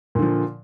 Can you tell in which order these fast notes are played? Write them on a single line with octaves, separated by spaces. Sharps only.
A#2 D3 F3